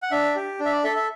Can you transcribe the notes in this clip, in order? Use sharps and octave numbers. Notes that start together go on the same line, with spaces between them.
F#5
D4 E5
G4
D4
E5
D5
A4 E5
E5